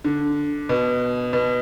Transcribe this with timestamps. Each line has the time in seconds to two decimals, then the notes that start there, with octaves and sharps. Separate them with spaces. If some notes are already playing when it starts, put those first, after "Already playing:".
0.04 D3
0.69 B2
1.33 B2